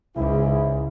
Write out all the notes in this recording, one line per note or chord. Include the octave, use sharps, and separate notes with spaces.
C#2 G#2 C#3 E4